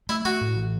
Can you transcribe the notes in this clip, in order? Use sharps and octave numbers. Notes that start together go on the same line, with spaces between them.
A3 E4
A3 F#4
A2
E3